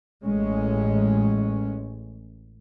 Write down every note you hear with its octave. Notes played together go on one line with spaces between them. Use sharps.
A1 G#3 C#4